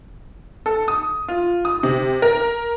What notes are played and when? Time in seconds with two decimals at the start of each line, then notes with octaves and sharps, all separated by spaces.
0.66 A4
0.88 D#6
1.28 F4
1.65 D#6
1.83 C3
2.22 A#4